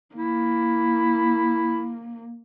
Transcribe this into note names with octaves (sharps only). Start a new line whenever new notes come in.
A#3 E4